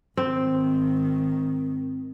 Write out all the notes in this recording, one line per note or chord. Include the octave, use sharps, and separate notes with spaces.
G#1 D#3 C4